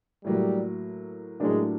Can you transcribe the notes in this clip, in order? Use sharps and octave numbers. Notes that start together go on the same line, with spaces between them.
A2 F#3 G3 A#3
A2 F#3 G#3 A#3 D4 G4